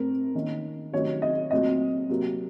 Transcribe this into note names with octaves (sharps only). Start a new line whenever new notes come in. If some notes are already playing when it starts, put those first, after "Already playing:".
Already playing: A2 A3 C4 A#4
D#3 A#3 C#4
C3 D#3 F#3 A3 C#4 C#5
D#5
A#2 F#3 A3 C4 D#5
C3 F#3 A#3